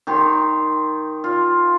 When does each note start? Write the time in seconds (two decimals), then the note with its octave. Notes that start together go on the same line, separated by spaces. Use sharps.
0.07 D#3 G4 G5 C6
1.24 F4